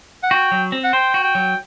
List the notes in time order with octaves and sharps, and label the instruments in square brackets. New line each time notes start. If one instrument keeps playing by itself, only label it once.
[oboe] F#5
[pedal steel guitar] F#4 [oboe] G5
[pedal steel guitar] F#3
C4
[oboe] F#5
[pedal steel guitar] C5 [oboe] G5
[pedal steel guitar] F#4
[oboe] G5
[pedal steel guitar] F#3